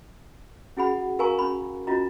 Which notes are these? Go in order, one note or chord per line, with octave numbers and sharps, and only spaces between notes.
C#4 E4 F#4 G#4 F#5 B5
F#4 A#4 F5 G#5 A#5 C#6
C#4 B5
C#4 D#4 F4 F#4 D#5 A#5